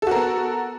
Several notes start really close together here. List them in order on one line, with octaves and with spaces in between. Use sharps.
A4 F#4 A#4 B3